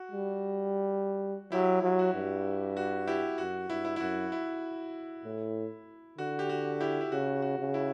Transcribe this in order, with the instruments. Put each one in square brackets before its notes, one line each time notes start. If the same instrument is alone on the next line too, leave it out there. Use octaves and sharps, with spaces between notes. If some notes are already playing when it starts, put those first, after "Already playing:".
Already playing: [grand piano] F#4
[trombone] G3
[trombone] F#3 [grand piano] E4 G4
[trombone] F#3
[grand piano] F#4
[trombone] G2
[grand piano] F#4
E4 G4
[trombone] F#2 [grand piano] F#4
[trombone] G2 [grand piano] E4
[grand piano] E4
E4
[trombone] F#2 [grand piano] F#4
[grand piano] E4
[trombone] A2
[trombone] D3 [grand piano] F#4
[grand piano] G4
F#4
E4 G4
E4
[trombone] C#3 [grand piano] F#4
[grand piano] F#4
[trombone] C#3
[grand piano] E4